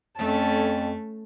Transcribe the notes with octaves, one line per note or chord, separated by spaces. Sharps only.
F2 A3 C#4 A5